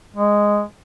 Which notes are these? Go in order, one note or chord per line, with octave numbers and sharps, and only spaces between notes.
G#3